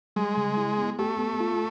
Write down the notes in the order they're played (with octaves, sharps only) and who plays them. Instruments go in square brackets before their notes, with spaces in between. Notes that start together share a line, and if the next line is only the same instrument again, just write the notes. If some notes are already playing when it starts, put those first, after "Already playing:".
[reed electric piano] G3 [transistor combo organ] G#3
[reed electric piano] C#3
E4
B3
[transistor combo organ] A3 [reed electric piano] G4
[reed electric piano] B3
F4